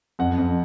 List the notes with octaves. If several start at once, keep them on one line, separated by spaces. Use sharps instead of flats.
F2 F#5
F2